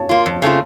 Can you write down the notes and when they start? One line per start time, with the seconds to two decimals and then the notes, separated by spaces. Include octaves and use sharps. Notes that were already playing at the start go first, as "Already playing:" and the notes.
Already playing: C#5 A5
0.09 A#3 F4
0.26 F2
0.42 C#3 A3 C4 F4